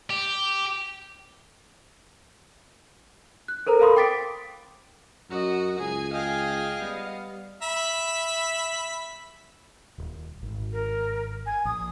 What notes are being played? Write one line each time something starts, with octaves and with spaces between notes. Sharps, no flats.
G4
F#6
A4 A#4 C5 A#5
A4 A#4 F5 B5 C6 D#6
G5 D6 A6 B6 D7
F#2 F#4 D#5 A#5
C#2 G#4 G#5
G#4 D#5 F5 G5 G#5
G3 B3
E5 B5
D#1
G#1
A#4
G#5
A#1 D#6